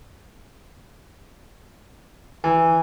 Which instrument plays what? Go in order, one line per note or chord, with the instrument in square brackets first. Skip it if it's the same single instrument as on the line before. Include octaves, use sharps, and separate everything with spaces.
[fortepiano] E3